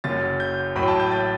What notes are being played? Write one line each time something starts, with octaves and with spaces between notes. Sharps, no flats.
F#1 F#2 F#3 A6
G6
A1 A2 F#3 B5
G5
A5
G6
A6